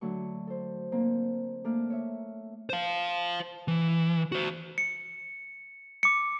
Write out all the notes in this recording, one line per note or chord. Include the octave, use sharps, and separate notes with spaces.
D3 F#3 A3 C#6
A4 C5
D3 A#3 C4
A3 A#3 D4 D5 F6
C#5 E5
C5 F5
E3
F#4 C5
C#7
D6 C#7